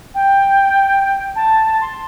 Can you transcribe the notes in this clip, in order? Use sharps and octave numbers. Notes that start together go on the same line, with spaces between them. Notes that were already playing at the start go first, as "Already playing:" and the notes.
G5
A5
C6